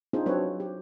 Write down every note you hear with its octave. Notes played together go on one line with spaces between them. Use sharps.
C4 D4 D#4 F4 G#4 C5
F#3 C4 D4 B4 C#5
G4